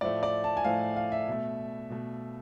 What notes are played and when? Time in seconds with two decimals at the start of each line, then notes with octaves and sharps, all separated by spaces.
0.01 A2 F3 A3 D5
0.23 D5
0.44 A5
0.57 G#5
0.64 A2 F3 A3 F5
0.96 F5
1.12 E5
1.28 B2 A3
1.90 B2 A3